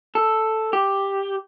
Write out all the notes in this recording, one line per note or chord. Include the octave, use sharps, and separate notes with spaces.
A4
G4